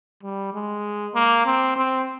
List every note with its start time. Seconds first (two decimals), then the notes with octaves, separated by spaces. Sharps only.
0.23 G3
0.54 G#3
1.15 A#3
1.46 C4
1.77 C4